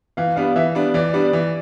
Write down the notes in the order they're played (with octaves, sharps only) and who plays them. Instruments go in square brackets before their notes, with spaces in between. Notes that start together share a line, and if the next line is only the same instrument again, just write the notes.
[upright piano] E3 [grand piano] F5
[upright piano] G3 B3 D4 [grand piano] F5
[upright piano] E3 [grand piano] E5
[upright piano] G3 B3 D4
[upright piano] E3 [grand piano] D5
[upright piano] G3 B3 D4
E3